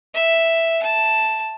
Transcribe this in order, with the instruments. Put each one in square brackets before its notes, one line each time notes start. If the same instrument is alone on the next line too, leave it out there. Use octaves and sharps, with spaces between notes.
[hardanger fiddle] E5
A5